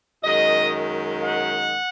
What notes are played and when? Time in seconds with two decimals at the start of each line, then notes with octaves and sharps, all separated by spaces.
0.22 F#2 D#3 G#3 D#5
1.20 F#5